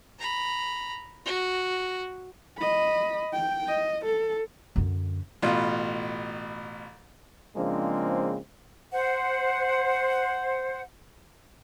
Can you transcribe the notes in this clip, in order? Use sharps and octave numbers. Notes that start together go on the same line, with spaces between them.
A#5 B5
F#4
D#5 B5
G5
D#5
A4
F#2 D3
A1 B2 F4
C#3 F3 G#3 A#3 C4 D4
C5 F#5